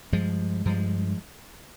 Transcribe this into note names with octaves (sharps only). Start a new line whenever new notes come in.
G2 F3 G#3
G2 F3 G#3